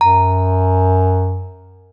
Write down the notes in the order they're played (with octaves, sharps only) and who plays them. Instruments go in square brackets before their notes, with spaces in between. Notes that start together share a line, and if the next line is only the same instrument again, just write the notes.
[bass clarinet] F#2 [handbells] A#5